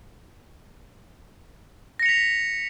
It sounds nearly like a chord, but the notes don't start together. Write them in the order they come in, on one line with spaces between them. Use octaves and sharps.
A#6 C#7 F7 B6